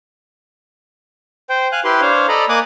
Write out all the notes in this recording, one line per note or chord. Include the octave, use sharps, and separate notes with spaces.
C5 G5
F5 G#5 F#6
E4 G4 B4 C6
D4 C5 C#5 F5
A4 D5 D#5 A#5 B5
A#3 D#5 G#5 D6 D#6 F#6